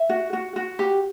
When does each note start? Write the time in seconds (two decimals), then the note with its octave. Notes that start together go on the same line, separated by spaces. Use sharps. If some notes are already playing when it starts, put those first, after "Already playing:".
Already playing: E5
0.09 F#4
0.33 F#4
0.56 F#4
0.79 G4